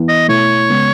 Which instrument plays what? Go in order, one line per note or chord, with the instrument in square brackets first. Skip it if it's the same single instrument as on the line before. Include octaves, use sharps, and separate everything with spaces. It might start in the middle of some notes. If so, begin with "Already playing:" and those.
Already playing: [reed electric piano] E3 B3 E4
[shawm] D#5
[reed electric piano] B2 A3 E4 [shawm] C#5
[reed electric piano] C#3 G#3 B3